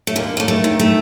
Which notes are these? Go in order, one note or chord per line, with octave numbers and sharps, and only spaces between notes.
A3
D#2 A#3
A3 A#3
A3
D#3
A3